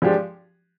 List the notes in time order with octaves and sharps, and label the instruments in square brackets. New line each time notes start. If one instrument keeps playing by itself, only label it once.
[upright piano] F3 G#3 D4 G4